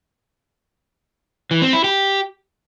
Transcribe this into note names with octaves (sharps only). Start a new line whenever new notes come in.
E3
C4
E4
G4